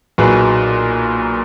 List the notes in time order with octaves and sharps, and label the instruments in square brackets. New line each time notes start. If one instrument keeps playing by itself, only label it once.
[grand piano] B1 A#2 F#3 G#4 B4